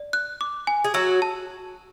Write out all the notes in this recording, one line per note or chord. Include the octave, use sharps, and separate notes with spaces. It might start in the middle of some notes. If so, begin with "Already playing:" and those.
Already playing: D5
F#6
D6
G#5
G#4
F#3 F#4 E6
A5